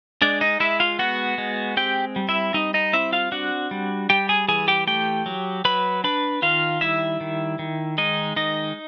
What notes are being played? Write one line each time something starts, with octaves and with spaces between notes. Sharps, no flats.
G#3 D4 D5
D#4 D#5
G#3 E4 E5
F4 F5
B3 F#4 F#5
G#3
C4 G4 G5
G3
E4 E5
G3 D#4 D#5
D#4 D#5
C4 E4 E5
F4 F5
D4 F#4 F#5
G3
G3 G4 G5
G#4 G#5
E3 G#4 G#5
G4 G5
A3 G4 G5
F#3
F#3 B4 B5
D4 B4 B5
D#3 F4 F5
G3 E4 E5
D#3
D#3
G#3 D#4 D#5
D#3 D#4 D#5